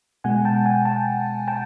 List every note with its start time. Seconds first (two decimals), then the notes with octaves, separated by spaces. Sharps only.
0.24 B2 G#3 F#5 G#5
0.45 G5 A5
0.66 F#5 G#5
0.85 G5 A5
1.48 G5 A5